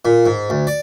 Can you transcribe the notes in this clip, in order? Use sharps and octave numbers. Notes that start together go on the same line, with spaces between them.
A#2
G#2
D2
D5